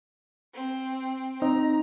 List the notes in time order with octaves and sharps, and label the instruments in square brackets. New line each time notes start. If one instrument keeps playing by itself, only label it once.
[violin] C4
[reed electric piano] C4 D#4 [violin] A#5